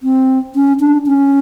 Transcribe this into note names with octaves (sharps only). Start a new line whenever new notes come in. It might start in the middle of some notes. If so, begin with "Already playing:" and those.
C4
C#4
D4
C#4